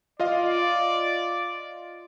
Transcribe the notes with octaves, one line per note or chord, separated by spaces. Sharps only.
F4 D5 D#5 F5